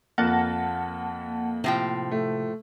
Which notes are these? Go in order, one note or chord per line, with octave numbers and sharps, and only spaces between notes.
F2 A#3 F#5 A5
A2 C3 F3 G5
A3